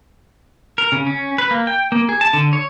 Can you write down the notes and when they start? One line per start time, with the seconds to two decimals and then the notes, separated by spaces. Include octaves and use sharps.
0.78 A#4
0.92 C#3
1.07 C#4
1.38 B4
1.51 A#3
1.67 G5
1.92 A#3
2.09 G#4
2.21 A5
2.33 D3
2.53 C#5